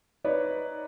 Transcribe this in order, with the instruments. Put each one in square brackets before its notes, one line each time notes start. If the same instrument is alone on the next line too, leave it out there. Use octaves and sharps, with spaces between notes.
[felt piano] D#4 B4 C#5 D5